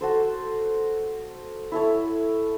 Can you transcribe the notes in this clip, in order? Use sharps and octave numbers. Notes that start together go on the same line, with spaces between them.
F#4 A4 C5
E4 A4 C#5